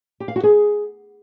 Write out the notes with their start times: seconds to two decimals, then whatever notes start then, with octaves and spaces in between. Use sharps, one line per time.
0.20 G4
0.28 F5
0.36 F#4
0.43 G#4